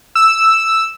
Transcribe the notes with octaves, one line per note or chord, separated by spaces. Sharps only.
E6